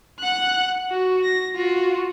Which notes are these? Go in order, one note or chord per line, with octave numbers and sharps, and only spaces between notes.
F#5 F#6
F#4
A#6
F4 F#4